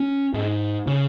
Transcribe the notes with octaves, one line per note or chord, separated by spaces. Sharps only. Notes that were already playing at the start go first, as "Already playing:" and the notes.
Already playing: C#4
G#2
C#3